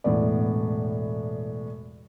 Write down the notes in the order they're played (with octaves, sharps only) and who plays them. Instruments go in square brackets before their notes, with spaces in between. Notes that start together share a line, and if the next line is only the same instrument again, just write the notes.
[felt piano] E1 A2 B3 D5